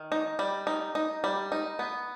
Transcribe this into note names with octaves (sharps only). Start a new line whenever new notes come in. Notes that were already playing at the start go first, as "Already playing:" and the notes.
Already playing: D#3
D#4
G3
D#4
D#4
G3
D#4
B3